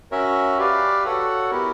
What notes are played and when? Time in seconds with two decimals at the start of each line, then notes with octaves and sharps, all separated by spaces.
0.11 C#4 F#4 A#4 C#5 E5
0.58 G4 B4 D5 F5
1.04 F#4 A4 C#5 F#5
1.50 B3 E4 G4 A#4